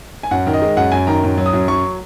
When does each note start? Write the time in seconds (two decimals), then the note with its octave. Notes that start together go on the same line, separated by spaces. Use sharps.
0.23 G#5
0.31 F#2 F#5
0.47 D#3
0.54 D#5
0.62 G#3
0.77 F#2 F#5
0.92 F#2 G#5
1.07 D#3 A#5
1.23 F#2
1.38 F#3
1.46 D#6
1.53 F#2
1.68 F#3 C#6